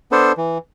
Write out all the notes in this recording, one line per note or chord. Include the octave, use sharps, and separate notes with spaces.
B3 D4 A4 C5
E3